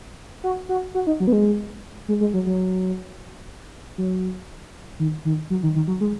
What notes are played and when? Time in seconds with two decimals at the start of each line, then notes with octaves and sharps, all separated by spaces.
0.44 F#4
0.69 F#4
0.95 F#4
1.07 D#4
1.20 F#3
1.27 B3
1.33 G#3
2.08 G#3
2.21 G#3
2.34 F#3
2.46 F#3
3.98 F#3
4.99 D#3
5.25 D#3
5.50 F#3
5.63 D#3
5.76 D#3
5.88 F#3
6.01 G#3